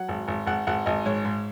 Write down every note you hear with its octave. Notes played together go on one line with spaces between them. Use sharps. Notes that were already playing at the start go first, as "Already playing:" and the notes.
Already playing: F#3 F#5
G#1
G#1
G#1 F#5
G#1 F#5
G#1 D#5
G#2 C#5
G#2